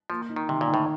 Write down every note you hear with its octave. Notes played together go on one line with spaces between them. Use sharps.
F3 A#3
D#4
D#3
C3 D#3
A#2
D#3
A2